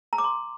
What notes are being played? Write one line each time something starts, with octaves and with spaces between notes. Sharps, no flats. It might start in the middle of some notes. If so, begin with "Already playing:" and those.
A#5
D6
C6